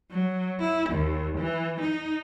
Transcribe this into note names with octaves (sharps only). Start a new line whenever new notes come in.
F#3
E4
D#2
E3
D#4